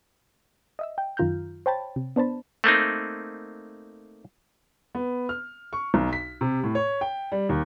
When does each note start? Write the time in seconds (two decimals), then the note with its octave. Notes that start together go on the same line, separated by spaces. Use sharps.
0.79 D#5 E5 E6
0.98 G5
1.17 F#2 D#3 F4 A#5 F6 G6
1.66 C5 C#5 G5 A5 B5 A6
1.96 C3
2.16 B3 D4 C5 A5 B5
2.64 A3 A#3 C4 D#4
4.95 B3
5.29 F6
5.73 C#6
5.94 B1
6.13 B6
6.41 C3
6.64 A2
6.75 C#5
7.01 G5
7.32 G3
7.49 D#2